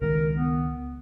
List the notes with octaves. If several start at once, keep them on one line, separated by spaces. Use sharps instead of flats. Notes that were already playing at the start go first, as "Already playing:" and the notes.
C#2 D#3 G#3 A#4
B3